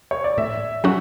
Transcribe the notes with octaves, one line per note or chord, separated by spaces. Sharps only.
C#5
D5
A2 E5
F#3 C#4 F#4 F#5